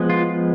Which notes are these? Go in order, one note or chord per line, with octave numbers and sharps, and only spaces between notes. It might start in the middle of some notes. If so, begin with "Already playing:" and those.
Already playing: F3 G#3 B3
F4